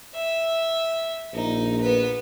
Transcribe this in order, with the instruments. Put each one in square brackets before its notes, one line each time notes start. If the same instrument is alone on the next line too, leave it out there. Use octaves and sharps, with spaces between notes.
[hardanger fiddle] E5
[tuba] A#1 [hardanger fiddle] D#4
[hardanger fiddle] B3 B4